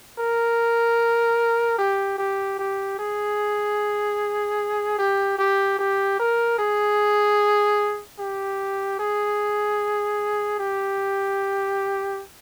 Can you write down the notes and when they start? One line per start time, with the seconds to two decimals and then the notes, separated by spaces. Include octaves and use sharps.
0.18 A#4
1.78 G4
2.18 G4
2.59 G4
2.99 G#4
4.98 G4
5.38 G4
5.79 G4
6.19 A#4
6.58 G#4
8.19 G4
8.99 G#4
10.59 G4